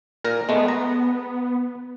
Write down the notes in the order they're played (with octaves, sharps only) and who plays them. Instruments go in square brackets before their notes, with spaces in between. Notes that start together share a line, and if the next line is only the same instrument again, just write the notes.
[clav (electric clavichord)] A#2 A#4 A#5
[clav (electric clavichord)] G#3 A3 [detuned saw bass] B3
[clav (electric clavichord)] A#5